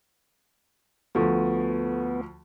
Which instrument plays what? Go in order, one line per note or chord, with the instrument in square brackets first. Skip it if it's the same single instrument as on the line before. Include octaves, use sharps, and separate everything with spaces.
[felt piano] D2 F3 [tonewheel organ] B3 [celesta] A4 C#6